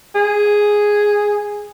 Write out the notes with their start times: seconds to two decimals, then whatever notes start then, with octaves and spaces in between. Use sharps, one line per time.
0.15 G#4